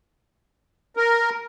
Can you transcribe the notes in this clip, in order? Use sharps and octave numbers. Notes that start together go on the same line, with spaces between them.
A#4